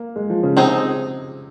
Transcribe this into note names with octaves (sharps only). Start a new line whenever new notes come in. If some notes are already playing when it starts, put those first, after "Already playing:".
Already playing: A#3
G#3
F3
C#3
C3 C4 D#4 G#4